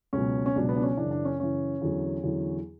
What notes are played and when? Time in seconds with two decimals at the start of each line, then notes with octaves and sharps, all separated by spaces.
0.13 C#2 B2 F#3 C#4
0.46 C#4
0.56 C#2 B2 F#3 D4
0.69 B3
0.76 D4
0.83 C#4
0.97 F#2 C#3 E3 D4
1.11 D4
1.25 C#4
1.39 F#2 C#3 E3 C#4
1.82 E2 D3 F#3
2.23 E2 D3 F#3